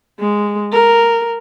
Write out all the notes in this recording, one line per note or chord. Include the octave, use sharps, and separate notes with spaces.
G#3
A#4